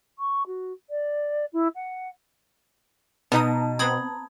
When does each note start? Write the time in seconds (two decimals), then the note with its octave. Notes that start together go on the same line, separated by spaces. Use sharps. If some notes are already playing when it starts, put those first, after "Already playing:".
0.19 C#6
0.47 F#4
0.90 D5
1.53 E4
1.75 F#5
3.32 B2 B3 D#4 A5 A#5 D#6
3.79 B3 C4 B5 D#6 G#6